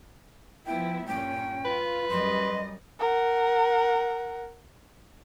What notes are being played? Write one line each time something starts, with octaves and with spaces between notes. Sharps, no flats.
F3 B3 E4 G5
G2 A#2 C#4 G5
F4 B4
F#2 G3 D#5 C6
A#4 F#5